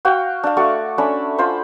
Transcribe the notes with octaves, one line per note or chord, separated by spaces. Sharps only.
F#4 F5 G5
D4 F5
A3 F#4 D5 C#6
A3 C#4 D4 B5
F4 C5 B5